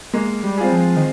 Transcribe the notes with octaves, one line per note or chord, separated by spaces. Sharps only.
G#3 A#3
G3
C4 F4 G#4
F3
D#3